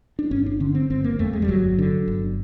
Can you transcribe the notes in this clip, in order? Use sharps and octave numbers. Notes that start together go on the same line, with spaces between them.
D4
G1 C#4
D4
D3 C#4
C4
G1 C4
A#3
F2 A3
G#3
G3
G1 F#3
D3
G1